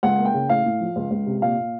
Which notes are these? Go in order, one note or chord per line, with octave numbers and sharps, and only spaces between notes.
C#2 F#5
A#3
G5
C#3
A2 F5
A2
F3
C#2
C#2
C3
A#2 F5
A#2